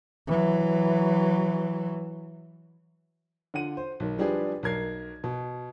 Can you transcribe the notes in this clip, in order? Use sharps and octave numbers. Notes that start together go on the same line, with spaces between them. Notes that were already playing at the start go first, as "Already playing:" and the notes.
E3 F#3
D3 F4 F#5 D#7
C5
B1 D#3
F3 G3 D4 G4 G#4 B4
B1 A#4 G#6 C7
B2